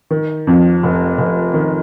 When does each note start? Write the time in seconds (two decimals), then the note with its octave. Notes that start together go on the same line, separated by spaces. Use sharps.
0.11 D#3
0.47 F2
0.83 F1
1.18 F1
1.54 D#3